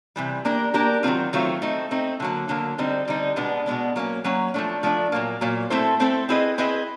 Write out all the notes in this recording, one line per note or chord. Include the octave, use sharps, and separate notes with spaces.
C3 E3 G3
A#3 D4 G4 A#4
A#3 D4 G4 A#4
D#3 F#3 A3 C4 F4
D#3 F#3 A3 C4 F4
A3 C4 D#4
A3 C4 D#4
D3 F#3 A#3
D3 F#3 A#3
D3 G3 C4 D#4
D3 G3 C4 D#4
B2 G#3 B3 D4
B2 G#3 B3 D4
F#3 A#3 C#4
F#3 A#3 C#4
F3 A3 D4
F3 A3 D4
A#2 F#3 A#3
A#2 F#3 A#3
A3 C4 E4 A4 C5
A3 C4 E4 A4 C5
C4 E4 G#4 B4 D#5
C4 E4 G#4 B4 D#5